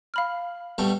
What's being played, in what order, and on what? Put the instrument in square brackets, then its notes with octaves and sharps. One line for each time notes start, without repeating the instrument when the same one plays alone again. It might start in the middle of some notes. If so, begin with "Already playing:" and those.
[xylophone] F5 B5 F6
[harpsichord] B2 G3 A3